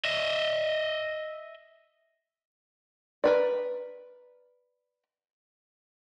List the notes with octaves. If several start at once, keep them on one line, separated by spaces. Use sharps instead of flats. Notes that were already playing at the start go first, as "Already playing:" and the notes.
D#5 E5
A#4 B4 D5